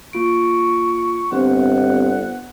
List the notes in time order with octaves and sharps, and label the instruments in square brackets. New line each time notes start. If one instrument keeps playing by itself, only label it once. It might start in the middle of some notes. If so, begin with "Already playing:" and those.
[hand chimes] A#3 F4 D7 [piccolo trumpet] C#6
[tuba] G1 [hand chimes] B3 D4 C5 [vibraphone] C4 G4 [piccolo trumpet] F#5